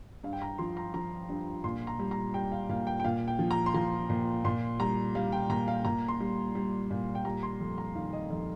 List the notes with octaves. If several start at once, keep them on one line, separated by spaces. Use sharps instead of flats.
G2 F5
G5
A#5
F3 C6
A#5
F3 A#5
G2
A#2 C6
A#5
G3
A#5
G3 G5
F5
A#2 F5
G5
G5
A#2 F5
G5
F3
A#5
C6
F3 A#5
A#2
A#2 C6
G3 A#5
G3 F5
G5
A#2 A#5
F5
A#2 A#5
C6
G3
G3
A#2
G5
G3 A#5
C6
F2
A#5
D#3 F5
D#5
F2 D#5